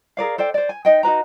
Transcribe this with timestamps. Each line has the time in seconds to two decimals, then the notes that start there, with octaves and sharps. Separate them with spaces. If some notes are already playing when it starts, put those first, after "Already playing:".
0.17 G#4 A#4 D5 F5
0.38 A4 C5 D5 G5
0.54 C5 D5
0.69 G#5
0.85 D#4 D#5 G5
1.03 D#4 F#4 B4 A#5